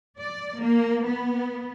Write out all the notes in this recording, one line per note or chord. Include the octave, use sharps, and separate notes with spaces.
D5
A#3
B3